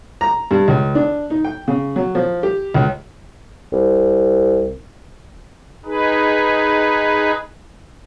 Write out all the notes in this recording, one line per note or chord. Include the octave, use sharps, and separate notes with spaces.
A#5
G2
C#2
D4
D#4
G5
C#3
F#3
F3
G4
C#2
C2
D#4 G#4 B4